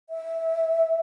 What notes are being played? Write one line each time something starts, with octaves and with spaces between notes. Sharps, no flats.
E5